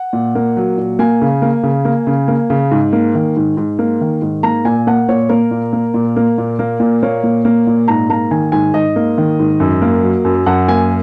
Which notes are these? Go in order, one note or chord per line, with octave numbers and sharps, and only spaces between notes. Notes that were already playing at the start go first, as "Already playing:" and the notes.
Already playing: F#5
A#2
A#3
F#3
A#2
A#3 G#5
C#3
A#3
C#3
A#3
C#3
A#3
C#3
G#2
A#3
D#3
G#2
G#2
A#3
D#3
G#2
A#3 A#5
A#2 G#5
A#3 F#5
A#2 C#5
A#3 A#4
A#2
A#3
A#2
A#3
A#2
A#3
A#2
A#3 C#5
A#2
A#3
A#2
G#2 A#5
A#3 A#5
D#3 G#5
G#2 G#5
G#2 D#5
A#3
D#3
G#2
F#2
A#3
F#3
F#2
F#2 F#5
A#3 G#5